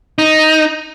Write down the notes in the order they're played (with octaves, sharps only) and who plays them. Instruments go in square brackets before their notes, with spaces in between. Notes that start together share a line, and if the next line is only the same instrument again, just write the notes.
[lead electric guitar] D#4